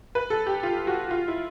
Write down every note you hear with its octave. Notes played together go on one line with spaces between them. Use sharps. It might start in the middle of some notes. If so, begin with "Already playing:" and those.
B4
A4
G4
F4
F#4
F4
E4